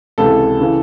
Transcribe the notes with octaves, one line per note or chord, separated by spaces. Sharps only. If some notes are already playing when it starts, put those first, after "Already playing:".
C#2 C3 E3 A4
C#3 E3